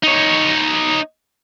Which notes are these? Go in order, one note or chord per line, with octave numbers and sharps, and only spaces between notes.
D#4 C#5